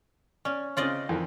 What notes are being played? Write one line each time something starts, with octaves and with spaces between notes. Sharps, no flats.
C#4 D5
C#3 C4 C#4 F4 D5 D#5
F2 D#3 E3